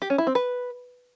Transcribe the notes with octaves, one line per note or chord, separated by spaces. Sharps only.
G4
C#4
E4
C4
B4